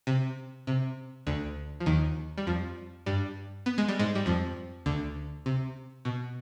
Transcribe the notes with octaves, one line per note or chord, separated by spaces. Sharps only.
C3
C3
D2 D3
F3
D#2 D#3
G3
F2 F3
G2 G3
B3
G#3
G3
G#2 G#3
G3
F2 F3
D2 D3
C3
B2